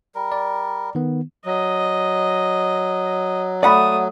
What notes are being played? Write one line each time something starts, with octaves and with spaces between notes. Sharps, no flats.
G3 A#4
D5
D#3 B3
F#3 D#5
A3 D5 F#5 B5 D#6